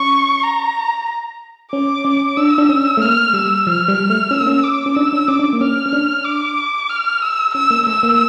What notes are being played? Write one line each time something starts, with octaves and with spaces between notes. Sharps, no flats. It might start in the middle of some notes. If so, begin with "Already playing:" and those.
Already playing: C#4 C#6
A#5
C#4 D6
C#4
D4 E6
D4
C#4
A3
A#3 F6
G3 E6
F3 F6
G3
A3
C#4 E6
A#3
C#4
D6
C#4
D4 E6
D4
C#4 D6
D4
C#4
A#3
C#4 F6
C#4
D4
D6
F6
E6
C#4 E6
A#3
A3 E6
A#3